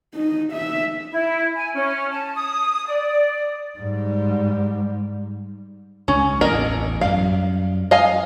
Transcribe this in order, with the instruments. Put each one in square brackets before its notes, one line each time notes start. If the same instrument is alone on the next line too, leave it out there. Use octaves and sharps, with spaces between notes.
[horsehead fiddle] D#4
E5
[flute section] E4
G#5
C#4
A5
D#6
D5
[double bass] G#2 G3
[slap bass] C#2 [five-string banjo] C#4
[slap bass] A1 E2 [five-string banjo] A#4 D#5 G5
[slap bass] F#2 G3 [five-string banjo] F5
[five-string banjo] D#5 F5 G#5